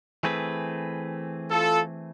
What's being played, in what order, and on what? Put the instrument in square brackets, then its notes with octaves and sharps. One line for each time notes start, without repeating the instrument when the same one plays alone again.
[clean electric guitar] E3 A3 C4 G#4 B4
[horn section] F4 A4